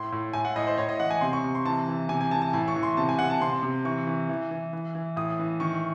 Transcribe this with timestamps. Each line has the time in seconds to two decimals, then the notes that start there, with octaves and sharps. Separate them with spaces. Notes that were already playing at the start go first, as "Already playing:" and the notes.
Already playing: A2 C6
0.12 A2
0.33 A2 G#5
0.45 F#5
0.56 A2 D#5
0.67 C5
0.78 A2 C#5
0.89 D#5
1.00 E3 F#5
1.11 G#5
1.21 C3 C6
1.33 C#6
1.44 C3
1.55 C6
1.66 E3 A5
1.88 E3
2.09 C3 G#5
2.21 G#5
2.31 E3 A5
2.42 A5
2.53 A2 G#5
2.68 C#6
2.76 E3
2.83 C6
2.97 C3 A5
3.09 G#5
3.19 C3 F#5
3.30 A5
3.41 C3 C6
3.63 C3
3.85 E3 C#6
4.07 E3
4.29 E3
4.51 E3
4.73 E3
4.95 E3
5.16 A2 D#6
5.39 E3
5.60 D#3 C#6